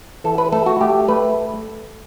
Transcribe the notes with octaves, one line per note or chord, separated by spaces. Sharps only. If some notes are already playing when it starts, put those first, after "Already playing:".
E3 A4
B4
A3 A4
F#4
A3 G4
A3 B4